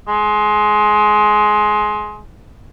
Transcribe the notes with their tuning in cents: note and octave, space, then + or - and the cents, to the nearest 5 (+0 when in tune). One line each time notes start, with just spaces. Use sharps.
G#3 +20